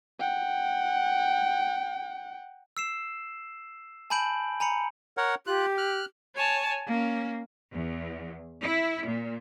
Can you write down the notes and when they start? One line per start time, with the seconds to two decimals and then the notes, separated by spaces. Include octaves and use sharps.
0.20 F#5 G5
2.77 E6 C7 E7
4.10 G#5 A5 B5 G6 D7 F#7
4.60 G#5 A#5 B5 C#7
5.17 A#4 C#5 F#5
5.47 F4 G4 F#6
5.78 F6 F#6
6.35 C#5 G#5 A5
6.86 A#3 C#4
7.73 E2
8.63 E4
9.06 A#2